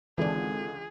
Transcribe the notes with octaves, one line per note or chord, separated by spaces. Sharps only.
G#1 C#2 D3 E3 D4 G#4